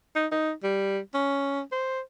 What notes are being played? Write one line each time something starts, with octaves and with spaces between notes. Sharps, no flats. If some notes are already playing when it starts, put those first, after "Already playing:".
D#4
D#4
G3
C#4
C5